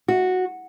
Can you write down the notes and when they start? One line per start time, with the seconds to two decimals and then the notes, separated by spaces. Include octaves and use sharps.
0.08 F#4